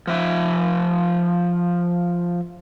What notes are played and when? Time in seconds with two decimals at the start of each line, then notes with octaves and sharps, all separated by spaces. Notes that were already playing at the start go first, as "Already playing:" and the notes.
0.07 F3 E5